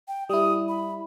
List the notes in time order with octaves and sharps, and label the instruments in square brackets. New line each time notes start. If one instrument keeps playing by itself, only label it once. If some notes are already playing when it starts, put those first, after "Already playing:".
[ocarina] G5
[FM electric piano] G3 E4 [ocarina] D#6
[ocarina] B5